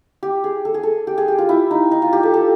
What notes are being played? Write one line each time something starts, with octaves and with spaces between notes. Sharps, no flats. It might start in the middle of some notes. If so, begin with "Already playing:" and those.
G4
G#4
A4
G#4
A4
G4
G#4
G4
F4
E4
D#4
D#4
F4
G4
A4
A4